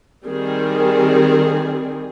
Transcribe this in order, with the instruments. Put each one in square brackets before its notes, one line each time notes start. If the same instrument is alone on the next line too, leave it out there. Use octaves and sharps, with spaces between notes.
[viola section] D#3 G3 C4 G#4